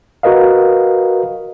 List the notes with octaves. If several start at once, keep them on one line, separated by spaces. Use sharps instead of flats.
F#4 A#4 B4 D#5 F5